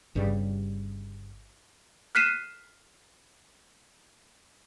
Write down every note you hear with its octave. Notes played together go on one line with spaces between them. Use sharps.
G1 G2 C#3 G3
F6 F#6 B6 C7 D#7 E7